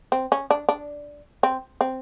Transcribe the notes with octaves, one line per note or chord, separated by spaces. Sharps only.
C4
C#4
D4
D4
C4
C4